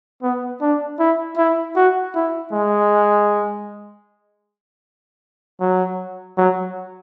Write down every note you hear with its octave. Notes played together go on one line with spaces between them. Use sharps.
B3
D4
E4
E4
F#4
E4
G#3
F#3
F#3